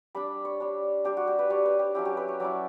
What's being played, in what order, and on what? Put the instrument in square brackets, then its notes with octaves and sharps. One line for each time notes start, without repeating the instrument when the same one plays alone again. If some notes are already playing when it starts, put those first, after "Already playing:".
[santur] G3 D4 B5
C#5
G3 D4
G3 D4 G4
F#4
G4
B4
G3 D4 C#5
B4
G4
F#3 C#4 E4 G4
G4
B4
C#5
F#3 C#4 E4 D5